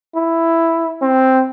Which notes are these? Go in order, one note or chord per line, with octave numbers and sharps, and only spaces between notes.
E4
C4